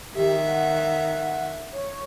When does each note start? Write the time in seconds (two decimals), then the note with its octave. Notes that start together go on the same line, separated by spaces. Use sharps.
0.15 D#3 G4 E5
0.46 F#5
1.73 C#5